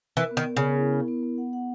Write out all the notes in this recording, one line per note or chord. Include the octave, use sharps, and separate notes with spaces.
E3 A#4
B3
D#3
B3
C#3
B3
E4
E4
B3
B3
F#5
F#5